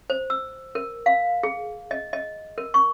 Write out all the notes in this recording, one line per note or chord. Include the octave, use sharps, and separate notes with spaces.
C5
E6
A#4
F5
G#4
D#5
D#5
A#4
C#6